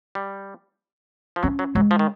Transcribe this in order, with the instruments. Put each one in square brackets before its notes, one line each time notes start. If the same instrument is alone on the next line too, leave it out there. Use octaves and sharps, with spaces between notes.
[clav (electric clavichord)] G3
F3
[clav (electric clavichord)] F#3 [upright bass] C#4
[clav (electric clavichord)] F#3
[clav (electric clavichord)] F#3 [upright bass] G#3
[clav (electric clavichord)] F3
D#3